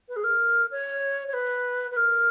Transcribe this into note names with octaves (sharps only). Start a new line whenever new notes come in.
B4
G#4
A#4
C#5
C#5
B4
B4
A#4